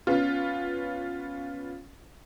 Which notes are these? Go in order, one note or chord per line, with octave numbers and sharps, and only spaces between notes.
B3 C#4 F4